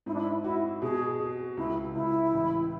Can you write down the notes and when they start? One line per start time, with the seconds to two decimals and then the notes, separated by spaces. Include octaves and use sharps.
0.06 G#2 E4
0.14 D4
0.21 E4
0.44 E4 F#4
0.82 B2 G#4
1.20 G#4
1.57 C#2 E4
1.95 C#2 E4
2.33 A1